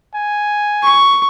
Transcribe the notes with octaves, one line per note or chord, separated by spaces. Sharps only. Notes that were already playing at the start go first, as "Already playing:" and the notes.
G#5
C#6